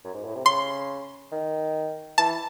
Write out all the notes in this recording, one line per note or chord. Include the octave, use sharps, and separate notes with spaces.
F#2
G#2
A2
C3
C#3 C6
D#3
E3 A5